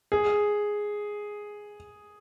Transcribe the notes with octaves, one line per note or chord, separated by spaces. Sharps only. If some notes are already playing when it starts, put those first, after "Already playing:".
G#4